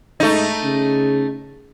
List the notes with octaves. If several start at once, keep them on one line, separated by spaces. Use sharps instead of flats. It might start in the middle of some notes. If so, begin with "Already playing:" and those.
G#2 A3 D#4
C#3